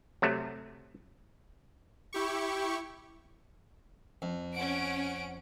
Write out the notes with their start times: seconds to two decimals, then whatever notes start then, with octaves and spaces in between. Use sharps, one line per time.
0.22 C3 F#3 A3
2.13 E4 G4 C#6
4.22 F2
4.54 C#4 F#5 D7